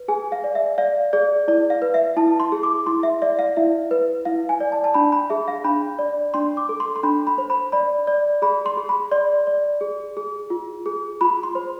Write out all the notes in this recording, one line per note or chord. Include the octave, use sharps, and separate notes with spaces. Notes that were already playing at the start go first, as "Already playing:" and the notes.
Already playing: B4
G#4 G#5
F5
D5
E5
D5 F5
G#4 D5
E4 D5
F5
B4
E5
E4 A5
C6
G#4
D6
E4 C6
E5
D5 E5
F5
E4 E5
B4
E4 F5
G#5
D5
A5
A5
D4 B5
B5
G#4 E5
F5
D4 B5
D5
D4 C6
D6
A4
C6
C6
D4 B5
B5
C5
B5
D5 B5
D5
G#4 B5
C6
G#4
B5
D5 C6
D5
G#4
G#4
F4
G#4
F4 B5
C6
C5